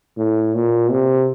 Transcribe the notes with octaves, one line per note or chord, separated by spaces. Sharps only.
A2
A#2
C3